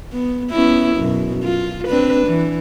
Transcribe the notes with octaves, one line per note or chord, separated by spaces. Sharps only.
B3
B3 C#4 E4
F#2 B2
F4
C4 D4 B4
E3